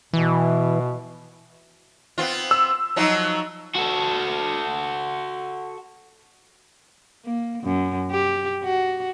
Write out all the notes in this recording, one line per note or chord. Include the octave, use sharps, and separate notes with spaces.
B2 E3
B3 C4 F4
E6
F3 F#3 D#4
F#4 A4
A#3
F#2
G4
F#4